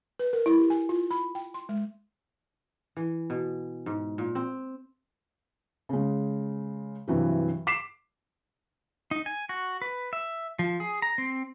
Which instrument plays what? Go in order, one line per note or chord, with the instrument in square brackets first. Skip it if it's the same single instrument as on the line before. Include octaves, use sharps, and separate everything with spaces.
[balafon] B4
A#4
E4
G4
G#5
F4
B5
G5
C6
G#3
[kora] E3
B2
G#2
A#2
C4
[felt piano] C#3 G#3
G2 C3 E3 F#3
D6 B6 C7 E7
[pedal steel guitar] D#4
G#5
F#4
B4
E5
F3
G#4
A#5
C4